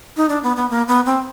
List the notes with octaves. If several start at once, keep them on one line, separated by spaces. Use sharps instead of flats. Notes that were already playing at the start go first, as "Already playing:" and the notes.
D#4
D4
B3
B3
A#3
B3
C4